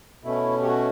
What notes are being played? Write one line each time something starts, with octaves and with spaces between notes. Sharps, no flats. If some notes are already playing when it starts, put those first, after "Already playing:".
B2 A3 C#4 E4
G4
F#4